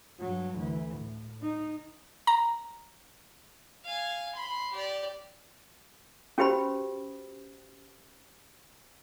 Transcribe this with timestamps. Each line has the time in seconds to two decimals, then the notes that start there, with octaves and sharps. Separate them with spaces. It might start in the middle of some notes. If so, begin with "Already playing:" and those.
0.20 G2 F#3
0.58 D2 E3
0.97 A2
1.42 D#4
2.27 A#5
3.84 F5 G#5
4.35 B5 C6
4.73 G4 D5
6.38 C#4 F#4 G4 B4 C5 B5